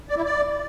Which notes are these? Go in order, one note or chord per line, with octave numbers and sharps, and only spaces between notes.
D5
E4
D5